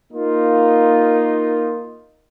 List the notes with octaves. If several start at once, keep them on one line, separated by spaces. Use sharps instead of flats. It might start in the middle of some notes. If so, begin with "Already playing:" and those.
A#3 D#4 F4